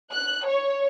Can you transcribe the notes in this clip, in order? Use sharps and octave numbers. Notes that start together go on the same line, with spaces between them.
F#6
C#5